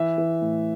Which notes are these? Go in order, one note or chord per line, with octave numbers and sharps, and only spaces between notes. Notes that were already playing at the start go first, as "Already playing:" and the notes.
Already playing: E3 E5
E3
A2